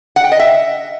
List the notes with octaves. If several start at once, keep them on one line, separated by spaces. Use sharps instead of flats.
F#5
G5
D#5
E5